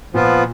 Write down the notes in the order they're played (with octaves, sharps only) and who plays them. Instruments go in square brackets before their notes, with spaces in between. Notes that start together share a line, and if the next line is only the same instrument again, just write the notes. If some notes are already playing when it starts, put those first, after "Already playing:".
[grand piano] A#2 [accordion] F3 B3 F4